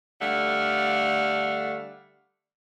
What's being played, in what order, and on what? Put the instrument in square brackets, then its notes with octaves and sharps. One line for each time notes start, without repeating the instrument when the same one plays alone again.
[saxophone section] D3 G3 A3 F5 F#5